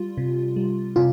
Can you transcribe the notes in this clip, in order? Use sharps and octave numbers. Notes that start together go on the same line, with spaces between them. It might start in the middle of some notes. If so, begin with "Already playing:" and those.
Already playing: G3 F4
C3
G3
C3 F4